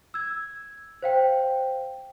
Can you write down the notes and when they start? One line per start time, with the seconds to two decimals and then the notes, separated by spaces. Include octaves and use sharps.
0.14 E6 G#6
1.02 C5 F5 G5